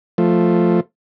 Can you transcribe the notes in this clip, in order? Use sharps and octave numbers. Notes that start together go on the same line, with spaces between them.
F3 A3